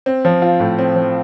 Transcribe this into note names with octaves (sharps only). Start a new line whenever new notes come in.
C4
F3
F4
A2
C4
F3